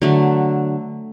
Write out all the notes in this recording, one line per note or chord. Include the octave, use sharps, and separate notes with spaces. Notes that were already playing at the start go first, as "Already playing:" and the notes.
D3 F#3 A3